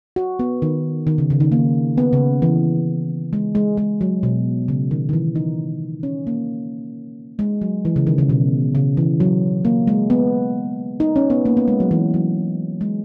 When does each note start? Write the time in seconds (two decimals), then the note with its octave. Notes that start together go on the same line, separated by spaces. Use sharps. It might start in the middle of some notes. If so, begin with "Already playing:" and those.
0.16 F#4
0.39 B3
0.62 D#3
1.07 D#3
1.18 C#3
1.30 C#3
1.40 D#3
1.52 A#3
1.98 B3
2.13 C#3
2.42 E3
3.33 G#3
3.55 G#3
3.77 G#3
4.01 F#3
4.23 B2
4.68 C#3
4.91 D#3
5.09 D#3
5.13 E3
5.35 D#4
6.03 C#4
6.27 A#3
7.39 G#3
7.62 F#3
7.85 E3
7.96 C#3
8.07 D#3
8.18 C#3
8.29 B2
8.75 C#3
8.97 E3
9.20 F#3
9.65 A#3
9.87 G#3
10.10 B3
11.00 D#4
11.16 C#4
11.30 B3
11.46 A#3
11.57 B3
11.68 G#3
11.80 F#3
11.91 E3
12.14 F#3
12.81 G#3